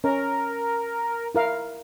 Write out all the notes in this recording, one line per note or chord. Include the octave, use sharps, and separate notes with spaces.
C#4 A#4
E4 A#4 F5